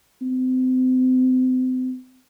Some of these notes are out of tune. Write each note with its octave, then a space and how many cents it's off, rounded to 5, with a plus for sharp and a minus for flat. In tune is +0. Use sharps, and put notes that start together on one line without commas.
C4 -35